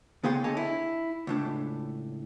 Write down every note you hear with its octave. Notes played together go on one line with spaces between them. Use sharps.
C#3 B3 G#4 F5 G5 C6
D3 C#5 D#5 G#5 A5
E4
C#2 A2 D4